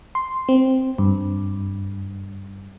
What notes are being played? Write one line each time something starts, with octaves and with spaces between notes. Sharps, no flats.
C6
C4
G2